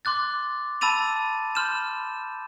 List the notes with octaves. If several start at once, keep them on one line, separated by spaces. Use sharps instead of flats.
C6 D6 F#6 A6
A5 B5 E6 A6 D#7 F7
B5 C6 F6 G6 E7